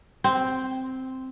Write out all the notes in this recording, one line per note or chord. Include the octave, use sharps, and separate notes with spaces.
C4